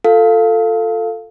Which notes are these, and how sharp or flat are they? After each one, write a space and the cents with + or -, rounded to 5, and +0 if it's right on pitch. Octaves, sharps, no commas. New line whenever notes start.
F4 +15 A4 +15 F5 +0